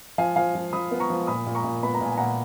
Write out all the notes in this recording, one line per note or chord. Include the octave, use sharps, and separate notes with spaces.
F3 F5 G#5
F3 F5 G#5
F3
F3 B5 D#6
B3
A#5 C#6
F3
A#2 B5 D#6
A#2
A#5 C#6
A#2
B3 B5
A#5
A#2 G#5
A#2 F#5 A#5